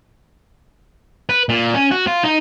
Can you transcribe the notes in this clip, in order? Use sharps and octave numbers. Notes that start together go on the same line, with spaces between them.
B4
A#2
C#4
F#4
F4
D#4